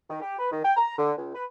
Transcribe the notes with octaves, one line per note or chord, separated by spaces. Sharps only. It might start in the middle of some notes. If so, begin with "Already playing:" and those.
D#3
G4
B4
D#3
G5
A#5
D3
C#2
B4